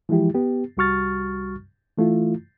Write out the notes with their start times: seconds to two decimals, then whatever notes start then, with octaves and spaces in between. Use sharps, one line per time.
0.09 E3 F3 G#3 E4 G4
0.34 B3 G4
0.77 C2 G3 F#4 C#6 F6 A6
1.98 E3 A3 E4 F4